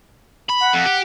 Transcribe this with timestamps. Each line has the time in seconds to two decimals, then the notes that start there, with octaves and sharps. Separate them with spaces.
0.49 B5
0.61 F#5
0.73 F2
0.86 G4